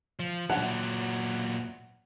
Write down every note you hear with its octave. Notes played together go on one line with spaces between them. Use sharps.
F3
A#2 F#3 F#5